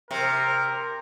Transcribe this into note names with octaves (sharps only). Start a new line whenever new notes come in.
C3 A#4